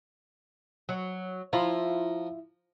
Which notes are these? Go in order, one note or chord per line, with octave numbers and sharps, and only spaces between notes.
F#3
F3 E4 F4 A#5